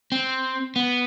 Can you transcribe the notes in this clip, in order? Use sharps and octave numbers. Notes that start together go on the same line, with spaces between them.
C4
B3